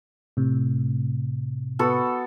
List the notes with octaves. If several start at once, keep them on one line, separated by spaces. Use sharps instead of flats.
A2 C3
B3 F#4 A4